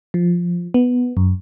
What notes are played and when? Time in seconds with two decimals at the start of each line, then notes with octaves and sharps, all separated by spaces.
0.14 F3
0.74 B3
1.17 F#2